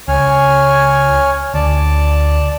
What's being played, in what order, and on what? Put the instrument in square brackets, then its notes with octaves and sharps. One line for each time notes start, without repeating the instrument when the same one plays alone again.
[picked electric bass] C#2 [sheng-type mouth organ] C#5 G#5 F6
[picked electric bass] D2 [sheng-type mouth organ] D5 A5